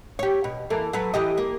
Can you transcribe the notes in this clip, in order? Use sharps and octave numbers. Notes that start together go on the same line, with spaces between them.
G4 C#5
B2
E3 A#3 A4
F#3 A4 B4
E3 G4 D#5
A#3